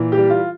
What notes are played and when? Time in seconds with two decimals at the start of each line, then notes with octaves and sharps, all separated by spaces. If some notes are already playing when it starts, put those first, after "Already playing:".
Already playing: A#2 E3
0.12 G4
0.18 G3
0.30 F4